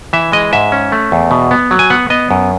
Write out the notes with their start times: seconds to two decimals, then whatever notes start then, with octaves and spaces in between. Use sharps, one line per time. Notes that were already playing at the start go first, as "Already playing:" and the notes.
0.13 E3 E5
0.32 G#3 D#5
0.53 G#2 E5
0.72 C#4
0.92 A3
1.12 E2
1.31 B2
1.51 B3
1.71 F#3
1.79 G#5
1.90 B3 F#5
2.10 B3 D#5
2.31 F#2